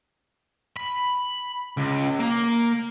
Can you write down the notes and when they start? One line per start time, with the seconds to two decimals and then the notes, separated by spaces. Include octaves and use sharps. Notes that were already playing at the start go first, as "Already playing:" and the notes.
0.76 B5
1.77 C#2
2.19 A#3